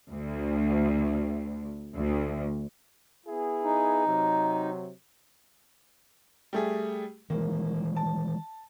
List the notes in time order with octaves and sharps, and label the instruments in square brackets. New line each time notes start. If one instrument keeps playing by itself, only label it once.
[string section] D2
D2
[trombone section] B3 E4 G#4
[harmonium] D#4
[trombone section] C3 F#3
[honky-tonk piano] G3 A3 G#4
[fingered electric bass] D#3 E3 G#3 [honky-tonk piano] A#3
[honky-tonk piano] A5